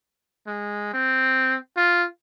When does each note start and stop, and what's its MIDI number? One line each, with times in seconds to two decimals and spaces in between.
0.47 0.91 56
0.94 1.57 60
1.77 2.06 65